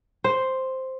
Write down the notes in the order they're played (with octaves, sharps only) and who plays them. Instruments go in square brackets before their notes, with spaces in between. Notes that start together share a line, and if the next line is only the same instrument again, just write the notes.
[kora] C5